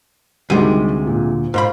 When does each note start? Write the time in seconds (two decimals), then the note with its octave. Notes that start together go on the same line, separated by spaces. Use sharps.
0.50 D2 C3 D#3 G3 G#3 D#7
1.07 A#2
1.54 G#2 F4 C5 B5